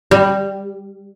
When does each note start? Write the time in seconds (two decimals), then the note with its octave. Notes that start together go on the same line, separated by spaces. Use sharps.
0.11 G3